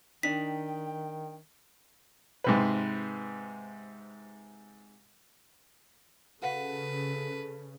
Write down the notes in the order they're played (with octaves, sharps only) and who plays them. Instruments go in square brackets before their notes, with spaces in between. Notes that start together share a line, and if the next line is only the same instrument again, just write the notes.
[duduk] D#3 [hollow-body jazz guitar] D4 D#4 [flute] G5 [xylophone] B6
[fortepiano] G#2 C3 B4
[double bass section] C#3 [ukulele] F#4 F5 F#5 [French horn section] A4 [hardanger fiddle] B4